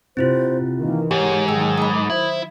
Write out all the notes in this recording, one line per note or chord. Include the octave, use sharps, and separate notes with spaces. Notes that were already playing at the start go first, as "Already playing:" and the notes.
C3 C4 E4 F4 C5
D#3 E3 A#3
G#2 G4 C#5
D#3 F#3 G#4 G5 E6
B5 D#6
E4 C5